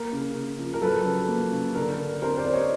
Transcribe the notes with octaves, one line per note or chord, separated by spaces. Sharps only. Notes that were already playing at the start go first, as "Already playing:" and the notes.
Already playing: A#3 A#4
C#3
C#3
F3
A#4
F#3 A4 B4
C#3
A#3
C#3
D3 A#4
D3
C4 A#4 C5
C5 D5
C4
C#5 D#5